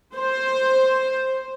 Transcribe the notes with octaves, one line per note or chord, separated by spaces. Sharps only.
C5